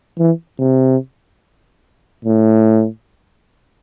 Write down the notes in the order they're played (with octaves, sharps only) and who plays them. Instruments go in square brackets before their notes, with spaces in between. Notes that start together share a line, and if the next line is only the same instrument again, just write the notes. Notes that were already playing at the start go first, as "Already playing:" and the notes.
[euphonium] E3
C3
A2